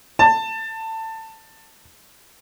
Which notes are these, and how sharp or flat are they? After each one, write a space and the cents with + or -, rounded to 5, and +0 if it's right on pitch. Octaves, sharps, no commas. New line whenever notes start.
A5 +20